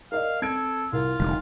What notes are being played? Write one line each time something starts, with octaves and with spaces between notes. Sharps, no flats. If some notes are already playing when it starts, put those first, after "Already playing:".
A#4 D5 D#5 F5
C4 A4 G#6 D7
C2 F4 A#4
F1 D#3 G3